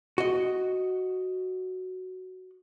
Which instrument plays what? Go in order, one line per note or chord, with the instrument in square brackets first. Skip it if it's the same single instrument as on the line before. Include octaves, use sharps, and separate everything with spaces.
[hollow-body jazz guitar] F#4 D#5